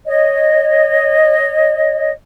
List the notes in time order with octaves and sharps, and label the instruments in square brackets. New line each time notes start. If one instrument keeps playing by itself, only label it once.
[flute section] C#5 D#5